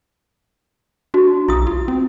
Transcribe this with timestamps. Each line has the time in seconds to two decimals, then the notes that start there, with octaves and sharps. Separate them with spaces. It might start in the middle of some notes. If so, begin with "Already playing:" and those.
1.14 D4 F#4
1.49 B1 E4 D#6
1.67 F4
1.88 C4